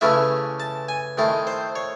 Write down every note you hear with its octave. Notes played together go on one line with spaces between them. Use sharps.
C#3 E3 A3 C#4 E4 E5
A5
G#5
D#3 A3 C4 E4
C5
C#5